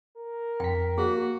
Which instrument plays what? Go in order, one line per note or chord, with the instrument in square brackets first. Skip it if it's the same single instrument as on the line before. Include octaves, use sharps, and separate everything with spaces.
[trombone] A#4
[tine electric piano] F2 B6 [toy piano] G5
[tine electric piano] A#3 [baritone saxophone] F#4 [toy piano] G#4